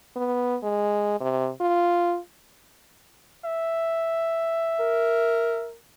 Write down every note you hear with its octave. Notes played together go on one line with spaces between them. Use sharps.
B3
G#3
C3
F4
E5
A#4